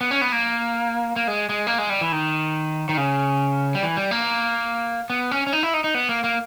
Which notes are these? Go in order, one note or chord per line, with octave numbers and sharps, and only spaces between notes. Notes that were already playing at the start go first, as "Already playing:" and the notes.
B3
C#4
B3
A#3
A#3
G#3
G#3
A#3
G#3
G3
E3
D#3
D#3
C#3
G3
E3
G3
A#3
B3
C#4
C#4
D#4
E4
D#4
D#4
B3
A#3
A#3